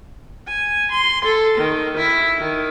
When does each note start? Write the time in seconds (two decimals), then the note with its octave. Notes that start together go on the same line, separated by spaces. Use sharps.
0.48 G#5
0.92 C6
1.25 A4
1.58 D#3
1.97 E4
2.39 D#3